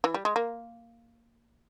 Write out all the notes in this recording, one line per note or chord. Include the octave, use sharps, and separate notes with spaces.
E3
G3
G#3
A#3